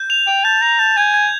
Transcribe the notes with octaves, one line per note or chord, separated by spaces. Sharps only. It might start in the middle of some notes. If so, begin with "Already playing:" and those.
Already playing: G6
F7
G5 F7
A5 G6
A#5 F7
A5 G6
G#5 G#6
G#6